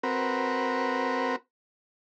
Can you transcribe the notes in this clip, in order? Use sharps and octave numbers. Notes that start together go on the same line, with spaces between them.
C4 F#4 A#4 B4